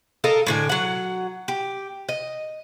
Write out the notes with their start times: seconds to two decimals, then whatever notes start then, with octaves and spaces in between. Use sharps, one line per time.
0.24 A4 A#4 D#5 F5
0.46 A2 D3 G#5
0.69 F#3 F#5
1.48 G4
2.09 D#5